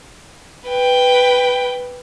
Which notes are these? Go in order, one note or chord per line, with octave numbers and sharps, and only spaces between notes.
B4 G5